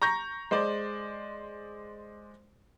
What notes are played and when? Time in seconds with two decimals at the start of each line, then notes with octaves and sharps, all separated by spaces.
0.02 A#5 C#6 G6 A#6
0.51 G#3 C5 D5